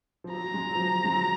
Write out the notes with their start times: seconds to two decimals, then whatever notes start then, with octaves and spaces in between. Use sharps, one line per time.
0.24 F3
0.32 F#3 A#5
0.43 F#3
0.54 G#3
0.69 F#3
0.75 F3
0.96 F#3
1.04 G#3
1.12 F#3